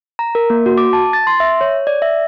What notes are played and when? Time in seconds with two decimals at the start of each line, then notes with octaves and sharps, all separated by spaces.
0.19 A#5
0.35 A#4
0.50 A#3
0.66 F#4
0.78 D6
0.93 A5
1.13 A6
1.27 C6
1.40 E5
1.61 C#5
1.87 D5
2.02 E5